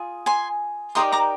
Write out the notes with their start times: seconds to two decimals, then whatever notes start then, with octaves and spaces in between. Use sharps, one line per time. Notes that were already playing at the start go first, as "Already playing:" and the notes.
Already playing: F4 G#4
0.26 G#5 C6
0.95 D#4 G4 A#4 D5 C6 D#6
1.12 A#5 D6